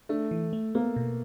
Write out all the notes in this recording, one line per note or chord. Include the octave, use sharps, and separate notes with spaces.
A3 D4
E3
A3
A#3 B3
B2